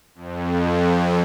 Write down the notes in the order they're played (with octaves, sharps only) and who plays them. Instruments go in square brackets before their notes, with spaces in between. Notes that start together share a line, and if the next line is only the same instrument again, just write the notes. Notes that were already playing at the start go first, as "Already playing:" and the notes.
[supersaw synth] F2